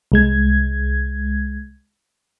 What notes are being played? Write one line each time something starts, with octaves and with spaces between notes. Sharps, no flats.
C2 G#3 G#6